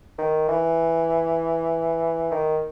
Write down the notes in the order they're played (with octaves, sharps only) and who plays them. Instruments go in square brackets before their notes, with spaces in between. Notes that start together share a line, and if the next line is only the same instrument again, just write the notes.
[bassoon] D#3
E3
D#3